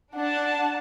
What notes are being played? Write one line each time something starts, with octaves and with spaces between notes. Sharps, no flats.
D4 F#5 A5